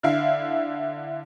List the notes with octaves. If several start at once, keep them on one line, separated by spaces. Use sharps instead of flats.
D3 E4 F5